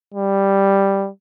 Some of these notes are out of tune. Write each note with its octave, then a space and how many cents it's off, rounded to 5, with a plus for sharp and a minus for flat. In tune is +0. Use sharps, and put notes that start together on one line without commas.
G3 +5